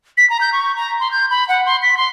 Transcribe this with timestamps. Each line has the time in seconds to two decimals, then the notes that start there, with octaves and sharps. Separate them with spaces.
0.17 B6
0.30 A#5
0.41 G6
0.53 C#6
0.76 A#5
1.00 C6
1.11 G6
1.30 B5
1.48 F#5
1.66 C6
1.83 B6
1.97 C6